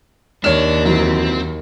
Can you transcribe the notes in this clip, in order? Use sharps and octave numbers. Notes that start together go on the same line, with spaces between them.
D#2 D4 C#5 F6 E7
F#2 E3 F#3 C4